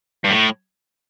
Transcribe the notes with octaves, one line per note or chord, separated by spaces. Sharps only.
G2
A2